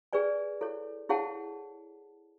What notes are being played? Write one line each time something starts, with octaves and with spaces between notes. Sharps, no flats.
G#4 B4 D5 G#5
E4 A4 C#5
E4 G#4 C#5 F#5 A5